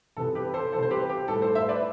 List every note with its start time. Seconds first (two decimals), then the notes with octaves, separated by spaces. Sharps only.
0.17 C3 E3 B3 A4
0.35 G4 B4
0.54 A4 C5
0.72 C3 E3 B3 A4 C5
0.83 C5
0.91 G4 B4
1.09 G4
1.28 A2 G3 B3 A4
1.42 A4 C5
1.55 C5 E5
1.69 B4 D5